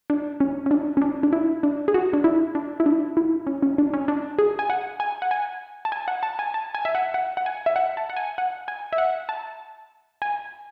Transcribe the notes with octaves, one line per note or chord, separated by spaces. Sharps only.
D4
C#4
C#4
D4
C#4
D4
D4
E4
D4
G#4
F#4
D4
E4
D4
E4
D4
E4
C#4
C#4
D4
C#4
D4
G#4
G#5
F#5
G#5
F#5
G#5
A5
G#5
F#5
A5
G#5
A5
G#5
E5
F#5
F#5
F#5
G#5
E5
F#5
A5
F#5
G#5
F#5
G#5
E5
F#5
A5
G#5